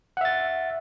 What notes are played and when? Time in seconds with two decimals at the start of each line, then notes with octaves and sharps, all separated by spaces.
0.17 F#5
0.21 E5
0.25 A6